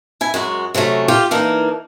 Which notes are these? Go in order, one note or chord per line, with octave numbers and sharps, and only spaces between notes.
E4 G#5
F#2 G#3 F#4
C3 F#3 G#3 A3 C#4
F4 G4
E3 A#3 D4 D#4